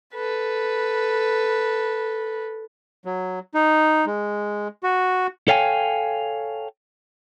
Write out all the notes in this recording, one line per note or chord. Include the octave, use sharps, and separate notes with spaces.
A4 B4
F#3
D#4
G#3
F#4
A4 C#5 F5 G5 G#5